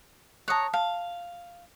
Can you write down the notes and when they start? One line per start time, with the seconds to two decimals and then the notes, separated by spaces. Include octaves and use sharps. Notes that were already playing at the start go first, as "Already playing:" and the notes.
0.48 C#5 A5 A#5 D#6 F#6
0.74 F5 A5